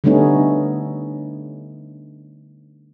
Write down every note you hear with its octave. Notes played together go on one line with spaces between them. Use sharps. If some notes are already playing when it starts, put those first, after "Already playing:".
D3 G3 A3 B3 C#4 D#4